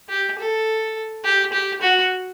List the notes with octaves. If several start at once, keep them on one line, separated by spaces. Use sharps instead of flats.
G4
A4
G4
G4
F#4